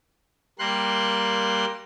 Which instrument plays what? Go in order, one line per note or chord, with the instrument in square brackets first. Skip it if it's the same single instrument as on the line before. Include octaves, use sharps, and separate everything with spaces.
[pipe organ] G3 A#3 C6 F#6